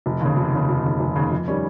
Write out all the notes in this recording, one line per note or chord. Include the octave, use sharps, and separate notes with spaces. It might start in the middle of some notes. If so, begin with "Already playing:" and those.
F1
D#2 C#3
F1
D#2 C#3
F1
D#2 C#3
F1
D#2 C#3
F2
D#3 G3 C#4